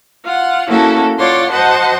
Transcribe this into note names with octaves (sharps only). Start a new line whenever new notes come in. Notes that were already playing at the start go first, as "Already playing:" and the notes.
F4 F#5
A#3 C#4 E4 F#4 A4
F4 C#5 D5 F#5 C6
F#4 C5 D#5 F#5 A5